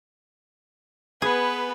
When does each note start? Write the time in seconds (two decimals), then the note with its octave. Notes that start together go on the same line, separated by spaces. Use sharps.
1.22 B3 G#4 B4